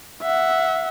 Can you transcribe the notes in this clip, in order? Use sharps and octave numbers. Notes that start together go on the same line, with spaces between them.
E5 F#5